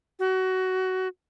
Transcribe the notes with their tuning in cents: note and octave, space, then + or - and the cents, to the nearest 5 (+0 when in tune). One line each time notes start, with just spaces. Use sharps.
F#4 +20